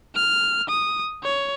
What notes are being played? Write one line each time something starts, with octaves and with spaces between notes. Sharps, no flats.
F6
D#6
C#5